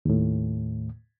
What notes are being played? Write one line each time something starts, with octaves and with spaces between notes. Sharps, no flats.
D#2 A2